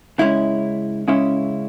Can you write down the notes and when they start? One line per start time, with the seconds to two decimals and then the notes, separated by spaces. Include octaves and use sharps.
0.18 C#3 G#3 C#4 E4
1.08 C#3 G#3 C#4 E4